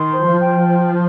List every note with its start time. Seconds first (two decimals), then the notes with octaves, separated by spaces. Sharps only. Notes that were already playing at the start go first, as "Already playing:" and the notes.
Already playing: D#3 C6
0.13 C5
0.27 F3
0.40 G5
0.68 C5